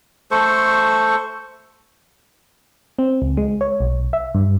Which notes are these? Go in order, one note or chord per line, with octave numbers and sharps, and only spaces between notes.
A3 A4 C5 C#6
C4
C#2
G#3
C#5
B1
E5
G2